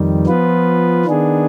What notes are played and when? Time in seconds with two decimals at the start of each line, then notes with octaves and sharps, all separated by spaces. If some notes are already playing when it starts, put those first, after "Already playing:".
Already playing: F2 D#3 G3
0.27 F3 B3 F4 B4
1.06 D#3 B3 D4 G#4